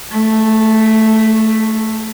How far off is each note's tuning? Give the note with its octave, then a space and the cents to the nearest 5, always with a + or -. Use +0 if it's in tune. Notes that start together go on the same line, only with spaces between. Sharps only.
A3 +0 G#4 +40